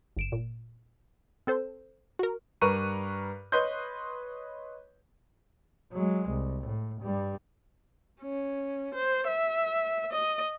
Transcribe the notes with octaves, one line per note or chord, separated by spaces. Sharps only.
G1 D7 E7
A#2
C4 A4 C5
F#4 A#4
G2 A#4 B4 A#5 C#6 D#7
B4 C#5 D#5 C6 G6
F#3 G#3
C2
A2
G2 G3
C#4
C5
E5
D#5